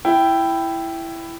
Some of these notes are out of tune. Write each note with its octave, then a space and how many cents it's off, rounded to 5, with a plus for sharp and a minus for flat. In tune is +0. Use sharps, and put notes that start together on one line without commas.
E4 +10 G5 -5